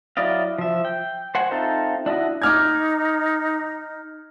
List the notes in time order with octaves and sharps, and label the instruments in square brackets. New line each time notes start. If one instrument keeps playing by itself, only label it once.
[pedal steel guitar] F#3 E4 D5 D#5 F5
F3 E5
G5
C5 F#5 G#5
C4 D#4 F4 A4 E5
D4 E4 F#4 D#5
[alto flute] D#4 [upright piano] D6 F6 G#6